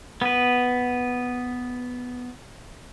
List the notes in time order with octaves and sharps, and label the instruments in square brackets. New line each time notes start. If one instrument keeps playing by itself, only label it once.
[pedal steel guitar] B3 B4